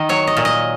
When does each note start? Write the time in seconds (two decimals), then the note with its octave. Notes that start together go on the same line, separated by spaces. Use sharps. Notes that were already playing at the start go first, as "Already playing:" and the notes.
Already playing: D#3 D#5
0.09 F#3 C#5
0.27 D#5
0.37 A#2
0.45 D#5